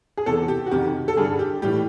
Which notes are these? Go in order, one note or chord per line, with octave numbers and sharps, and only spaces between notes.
G#4
E2 C3 E3 A4
G4
F#4
F2 C3 D#3 G4
A4
G2 D3 G3 G#4
G4
A2 E3 G3 G4